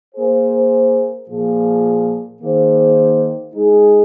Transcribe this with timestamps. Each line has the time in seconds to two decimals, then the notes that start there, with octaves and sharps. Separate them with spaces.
0.15 A#3 G#4 C5
1.28 A#2 F3 A#3 G#4
2.41 D#3 A#3 G#4 C5
3.54 G#3 D#4 G#4